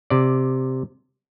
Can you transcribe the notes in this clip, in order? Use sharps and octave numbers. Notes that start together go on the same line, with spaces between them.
C3 D5